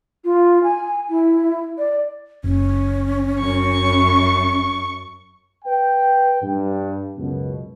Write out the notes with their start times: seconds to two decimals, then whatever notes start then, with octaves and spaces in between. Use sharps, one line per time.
0.25 F4
0.64 G#5
1.10 E4
1.78 D5
2.44 F#1 C#4
3.40 F#2 C#6
5.64 B4 G5
6.41 G2
7.15 C#2 F#2 B2